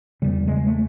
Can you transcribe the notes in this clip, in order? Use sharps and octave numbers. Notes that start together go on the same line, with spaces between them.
E2 C#3 G3
G#3
A3